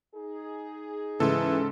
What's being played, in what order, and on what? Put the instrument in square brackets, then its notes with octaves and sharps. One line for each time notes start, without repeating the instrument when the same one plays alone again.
[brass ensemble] D#4 G#4
[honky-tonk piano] G#2 C#3 [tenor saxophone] E3 [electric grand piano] A4